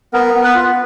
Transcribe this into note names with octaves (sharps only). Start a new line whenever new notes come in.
B3 A#4
B3
B4
F4